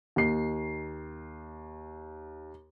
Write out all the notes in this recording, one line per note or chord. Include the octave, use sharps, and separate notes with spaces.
D#2 C7